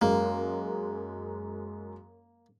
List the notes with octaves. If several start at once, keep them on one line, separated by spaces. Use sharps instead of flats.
F#2 G#3 A#3